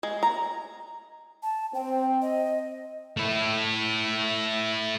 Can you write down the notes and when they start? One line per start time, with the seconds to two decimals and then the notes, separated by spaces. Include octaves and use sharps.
0.03 G#3
0.23 A#5
1.43 A5
1.74 C4 G5
2.22 D#5
3.17 A3 E4